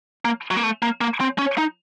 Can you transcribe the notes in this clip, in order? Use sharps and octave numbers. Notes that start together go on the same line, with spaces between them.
A#3
F#3
A#3
A3
A#3
A#3
C4
C#4
D#4